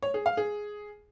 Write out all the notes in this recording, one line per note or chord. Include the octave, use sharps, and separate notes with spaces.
C#5
G#4
F5
G#4